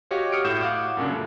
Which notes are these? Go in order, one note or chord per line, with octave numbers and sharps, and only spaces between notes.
F#4 G4 C#5 D#5 F5
C#6 D#6 F6 C#7 D7
A2 G6 E7
F5 F#5 D6
F#2 A#2 C#3 D4
A3